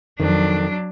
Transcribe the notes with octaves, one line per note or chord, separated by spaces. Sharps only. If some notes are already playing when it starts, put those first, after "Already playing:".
F2 D#3 F#3 D4